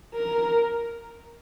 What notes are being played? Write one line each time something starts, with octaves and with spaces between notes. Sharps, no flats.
A#4